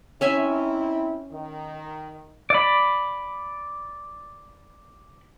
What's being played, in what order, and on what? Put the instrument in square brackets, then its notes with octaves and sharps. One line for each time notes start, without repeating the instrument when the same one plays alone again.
[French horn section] C4 D#4 E4 [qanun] C#4 E5 G#5
[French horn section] D#3
[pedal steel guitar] D5 B5